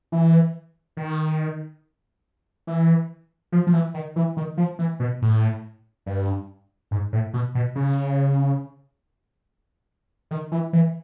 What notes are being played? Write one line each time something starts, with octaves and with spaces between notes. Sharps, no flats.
E3
D#3
E3
F3
F3
E3
D#3
E3
D#3
F3
E3
B2
A2
G2
G#2
A2
B2
B2
C#3
D#3
E3
E3